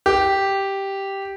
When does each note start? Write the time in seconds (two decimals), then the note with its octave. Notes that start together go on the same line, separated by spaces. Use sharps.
0.06 G4